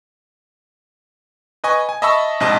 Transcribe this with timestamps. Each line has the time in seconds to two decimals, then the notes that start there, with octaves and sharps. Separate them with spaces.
1.64 B4 D#5 G#5 C#6
1.89 G#5
2.02 D#5 E5 A5 B5 C#6 E6
2.40 A#1 G#2 C3 D#5 A5